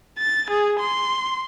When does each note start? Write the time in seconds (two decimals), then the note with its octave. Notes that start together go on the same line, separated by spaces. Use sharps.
0.18 A6
0.50 G#4
0.80 C6